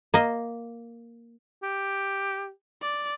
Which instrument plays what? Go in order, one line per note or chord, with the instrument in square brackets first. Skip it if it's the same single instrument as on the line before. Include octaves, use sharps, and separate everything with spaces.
[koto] A#3 D#5
[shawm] G4
[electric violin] D5